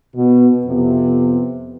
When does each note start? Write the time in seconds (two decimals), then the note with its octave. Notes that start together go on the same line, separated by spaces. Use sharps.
0.15 B2 B3
0.66 F2 C3 B3